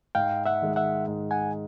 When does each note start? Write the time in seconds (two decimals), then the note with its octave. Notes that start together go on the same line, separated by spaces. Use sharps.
0.15 G#2 F5 G5
0.46 E5 F#5
0.62 D#3 G#3
0.76 E5 F#5
1.08 G#2
1.31 F#5 G#5